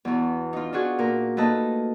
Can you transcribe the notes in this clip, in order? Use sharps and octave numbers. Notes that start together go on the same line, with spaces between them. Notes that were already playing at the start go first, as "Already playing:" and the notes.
E2 B2
D#4 F4
D4 F4 F#4 G#4
A#2 A#4
A3 A#3 D#4 B4 D#5 A5